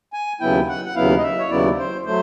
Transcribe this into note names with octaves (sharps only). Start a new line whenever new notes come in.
G#5
D#2 C#3 F#3 B3 E4 G5
F#5
F#5
D#2 C#3 F#3 B3 E4 F5
D#5
E5
C#5
D#2 C#3 F#3 B3 E4 D5
C5
F#3 A3 C5